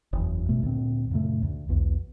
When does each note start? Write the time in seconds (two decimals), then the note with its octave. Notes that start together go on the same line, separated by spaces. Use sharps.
0.13 F#1 E2
0.49 G2 B2 A3
0.63 D2 A#2 C4
1.11 F#2 A#2 C#3 A3
1.42 D2
1.69 B1 E2